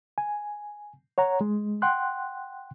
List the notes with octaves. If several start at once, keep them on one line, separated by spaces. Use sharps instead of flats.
G#5
C#5 F#5 A#5
G#3
F#5 G5 C6 F#6